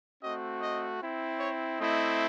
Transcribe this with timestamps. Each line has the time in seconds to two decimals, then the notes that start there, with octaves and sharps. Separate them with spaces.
0.22 A3 C4 F#4 D#5
0.61 D#5
1.01 C4 E4
1.39 C#5
1.79 A3 C4 E4 D#5